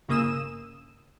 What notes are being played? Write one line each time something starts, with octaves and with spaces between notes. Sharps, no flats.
G1 C#3 A#3 D#6 E6 E7